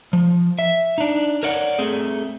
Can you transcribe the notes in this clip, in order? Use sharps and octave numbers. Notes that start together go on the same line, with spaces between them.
F3
E5
D4 D#4
A#4 C#5 D5 F#5
A3 C4 G#4